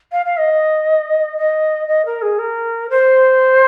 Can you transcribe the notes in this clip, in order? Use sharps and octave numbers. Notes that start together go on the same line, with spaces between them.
F5
F5
D#5
D#5
D#5
A#4
G#4
A#4
C5